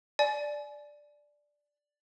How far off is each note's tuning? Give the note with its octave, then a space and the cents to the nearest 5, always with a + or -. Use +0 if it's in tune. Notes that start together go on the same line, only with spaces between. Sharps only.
D5 +0 G#5 +30